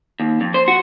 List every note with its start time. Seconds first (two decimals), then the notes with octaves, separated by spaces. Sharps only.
0.20 D#2
0.41 F2
0.54 C5
0.68 F#4